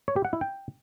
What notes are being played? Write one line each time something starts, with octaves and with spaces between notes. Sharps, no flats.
C#5
G4
F#5
E4
G5